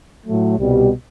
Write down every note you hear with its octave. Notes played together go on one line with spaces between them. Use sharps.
A2 F#3 A3
C2 B2 G3